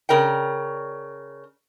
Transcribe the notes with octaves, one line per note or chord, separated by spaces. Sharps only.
C#3 A#4 D5 G5